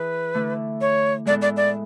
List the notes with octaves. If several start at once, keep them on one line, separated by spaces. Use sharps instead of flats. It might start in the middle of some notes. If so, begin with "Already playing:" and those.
Already playing: E3 E4 G#4 B4
D3 A3 E4 A4
C#5
A2 G#3 B3 E4 A4 D5
D5
D5